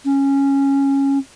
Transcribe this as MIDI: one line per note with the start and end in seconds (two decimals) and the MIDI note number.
0.05 1.18 61